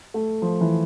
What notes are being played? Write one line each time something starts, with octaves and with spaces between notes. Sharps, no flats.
A3
F3
E3